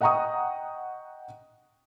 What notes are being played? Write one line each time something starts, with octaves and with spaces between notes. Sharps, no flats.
D#5 F#5 G5 A#5 C#6 D#6